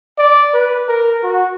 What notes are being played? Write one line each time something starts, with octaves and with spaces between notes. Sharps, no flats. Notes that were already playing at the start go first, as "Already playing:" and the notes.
D5
B4
A#4
F#4